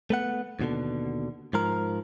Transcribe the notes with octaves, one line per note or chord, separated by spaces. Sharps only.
A3 B3 F#5
D#2 B2 D3
G#2 F3 A#4